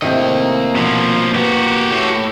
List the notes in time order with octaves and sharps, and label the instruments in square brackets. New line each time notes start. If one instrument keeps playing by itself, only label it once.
[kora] A2 C3 D#3 [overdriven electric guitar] A#3 D#5
[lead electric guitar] B2 F3
[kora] B3 [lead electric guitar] F#4 G4
[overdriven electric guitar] A2